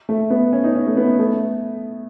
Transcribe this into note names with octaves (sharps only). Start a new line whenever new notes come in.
A3
B3
C#4
D#4
C#4
A3
B3
A3